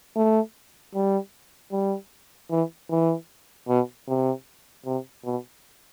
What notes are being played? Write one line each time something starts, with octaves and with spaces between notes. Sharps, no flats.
A3
G3
G3
E3
E3
B2
C3
C3
B2